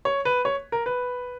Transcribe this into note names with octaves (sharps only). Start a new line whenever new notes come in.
C#5
B4
C#5
A#4
B4